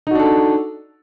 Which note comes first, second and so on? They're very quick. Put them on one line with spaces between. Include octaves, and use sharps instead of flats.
D#4 F#4 D4 A4